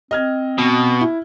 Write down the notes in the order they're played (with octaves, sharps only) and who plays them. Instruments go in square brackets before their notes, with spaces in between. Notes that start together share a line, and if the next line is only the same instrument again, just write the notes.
[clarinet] C4 [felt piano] D#5 F6 G#6
[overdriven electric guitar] B2
[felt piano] E4